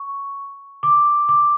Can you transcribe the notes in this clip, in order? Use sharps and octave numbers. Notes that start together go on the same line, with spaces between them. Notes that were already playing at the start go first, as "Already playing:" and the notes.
Already playing: C#6
D6
D6